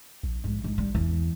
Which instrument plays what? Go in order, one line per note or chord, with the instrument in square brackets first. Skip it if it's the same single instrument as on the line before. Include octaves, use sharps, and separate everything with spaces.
[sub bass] A#1
[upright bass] G#2
G#2
G3
[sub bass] E2 [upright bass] E3